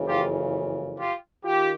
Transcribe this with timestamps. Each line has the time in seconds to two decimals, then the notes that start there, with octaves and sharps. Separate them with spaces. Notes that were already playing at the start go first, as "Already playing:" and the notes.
Already playing: F#1 F2 C#3 E3
0.08 F4 G4
0.99 F4 G4
1.44 D#3 F4 G4